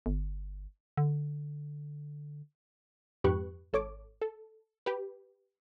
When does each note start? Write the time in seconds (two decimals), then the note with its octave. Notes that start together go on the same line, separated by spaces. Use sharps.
0.06 G1
0.97 D3
3.24 F2 G#2 G4 B4 C#6 F#6
3.73 G#1 A4 C#5 D6
4.22 A4
4.86 G4 B4